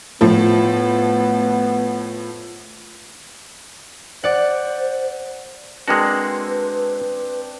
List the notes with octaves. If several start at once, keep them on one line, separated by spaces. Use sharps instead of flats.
A2 F3 B3
C5 D5 F#5
G#3 A#3 C4 D4 F#4 B4